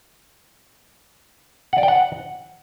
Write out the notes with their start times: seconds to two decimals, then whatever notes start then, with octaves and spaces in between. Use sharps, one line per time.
1.73 F#5
1.78 D5
1.83 G5
1.88 F#5